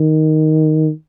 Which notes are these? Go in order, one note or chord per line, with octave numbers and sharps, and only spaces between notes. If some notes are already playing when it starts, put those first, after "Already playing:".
Already playing: D#3